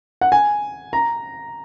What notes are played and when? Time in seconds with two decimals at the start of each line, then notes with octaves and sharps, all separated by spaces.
0.21 F#5
0.32 G#5
0.93 A#5